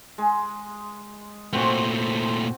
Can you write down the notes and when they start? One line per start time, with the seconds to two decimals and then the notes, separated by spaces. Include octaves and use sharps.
0.18 G#3
1.53 A#2 A3 C4 F#4 C5